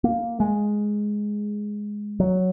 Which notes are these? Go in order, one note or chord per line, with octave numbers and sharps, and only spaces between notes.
A#3
G#3
F#3